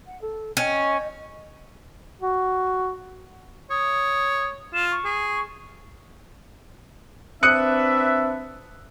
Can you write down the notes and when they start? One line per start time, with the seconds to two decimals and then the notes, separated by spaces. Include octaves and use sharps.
0.07 F#5
0.22 A4
0.57 C#4 D#5 G6
2.21 F#4
3.70 C#5 D#6
4.74 F4 E7
4.91 C#6
5.05 G#4
7.43 C4 D4 B4 E5 D#6 F#6 C#7